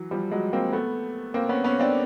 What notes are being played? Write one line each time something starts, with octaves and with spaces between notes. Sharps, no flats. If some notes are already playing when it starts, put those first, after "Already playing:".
Already playing: E3 F#3
F3 G3
F#3 G#3
A#3 C4
A3 B3
A#3 C4
B3 C#4
B3 C#4
C4 D4